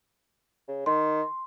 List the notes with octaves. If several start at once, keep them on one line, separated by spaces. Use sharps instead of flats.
C#3
D#3 C6